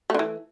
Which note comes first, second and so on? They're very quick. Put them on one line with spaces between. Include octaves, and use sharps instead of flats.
A3 D3 E3